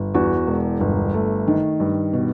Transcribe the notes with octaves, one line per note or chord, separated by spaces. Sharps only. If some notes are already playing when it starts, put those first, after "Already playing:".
Already playing: G1
E2 F#4
E1
G1
A3
D#3
G2
B2